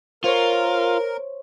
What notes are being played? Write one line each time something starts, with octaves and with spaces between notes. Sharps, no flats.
F4 A#4 C5 C#5